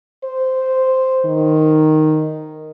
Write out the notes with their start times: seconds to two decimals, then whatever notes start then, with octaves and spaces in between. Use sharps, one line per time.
0.24 C5
1.25 D#3